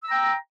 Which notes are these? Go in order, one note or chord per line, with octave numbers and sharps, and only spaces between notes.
G5 A#5 E6